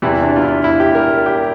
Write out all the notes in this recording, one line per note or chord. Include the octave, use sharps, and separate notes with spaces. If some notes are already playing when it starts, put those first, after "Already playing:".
E2 C3 E3 E4
D4
F4
E4
E4
G4
A#4
G4